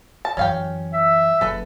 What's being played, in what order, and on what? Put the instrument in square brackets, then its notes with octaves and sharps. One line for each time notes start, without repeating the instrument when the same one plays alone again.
[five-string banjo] A5
[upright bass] F#2 E3 [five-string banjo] C#4 F5 G5
[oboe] E5
[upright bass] F#1 [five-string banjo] A4 B4